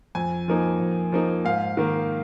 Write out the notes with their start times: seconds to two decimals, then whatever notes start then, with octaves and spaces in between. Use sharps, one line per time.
0.15 F2 G#5
0.48 F3 A#3 D#4
0.80 F2
1.12 F3 A#3 D#4
1.45 G#2 F5
1.77 D#3 A#3